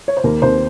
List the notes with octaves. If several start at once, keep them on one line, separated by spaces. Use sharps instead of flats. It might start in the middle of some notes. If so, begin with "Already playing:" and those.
C#5
C5
D#2 A#3 A#4
D#2 C4 C5